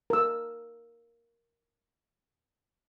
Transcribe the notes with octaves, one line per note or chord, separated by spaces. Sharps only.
A#4 E6